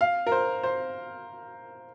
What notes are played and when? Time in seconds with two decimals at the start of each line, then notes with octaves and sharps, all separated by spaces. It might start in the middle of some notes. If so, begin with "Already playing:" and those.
0.01 F5
0.27 A#4
0.32 C5
0.63 C5